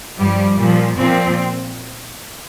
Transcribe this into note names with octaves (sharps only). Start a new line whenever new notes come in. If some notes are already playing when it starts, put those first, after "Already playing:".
G2 F3 G3
A#2 F3
A#2 F3 C4